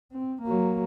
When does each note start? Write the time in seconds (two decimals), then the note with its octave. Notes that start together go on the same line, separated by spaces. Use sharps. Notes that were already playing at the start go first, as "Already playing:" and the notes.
0.12 C4
0.43 F#3 A#3